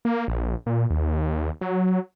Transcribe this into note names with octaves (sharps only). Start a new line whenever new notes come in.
A#3
A#1
A#2
D#2
F#3